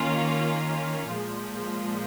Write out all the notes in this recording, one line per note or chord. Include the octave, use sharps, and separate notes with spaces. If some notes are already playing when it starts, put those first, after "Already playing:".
Already playing: D#3 A#3 C#4 F4
A#2 F3 G#3